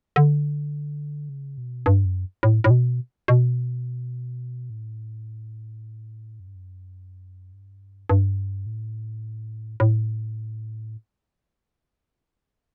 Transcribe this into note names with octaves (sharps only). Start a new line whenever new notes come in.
D3
C#3
B2
G2
F#2
A2
A2
B2
B2
A2
F#2
G2
F#2
G2
G2
A2
A2